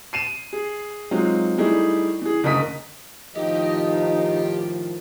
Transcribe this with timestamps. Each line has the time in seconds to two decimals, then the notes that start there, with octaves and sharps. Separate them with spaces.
0.13 C7 D#7 E7
0.53 G#4
1.11 F#3 G#3 C4 D#4 F4
1.58 G3 A3 D#4 E4 G#4
2.22 E3 G#4
2.44 F#1 D2 A#4 D#5 D#6 B6
3.36 A2 D#3 F3 D#4 G4 D#5 G5